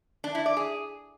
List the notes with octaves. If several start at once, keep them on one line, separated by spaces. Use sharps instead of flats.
D4
E4
D5
G#4